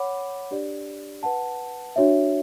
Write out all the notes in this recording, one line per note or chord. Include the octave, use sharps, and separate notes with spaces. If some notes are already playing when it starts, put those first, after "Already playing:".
Already playing: C#5 F#5 B5 D6
D4 G4 D5
B4 F#5 A5
D4 F#4 C#5 E5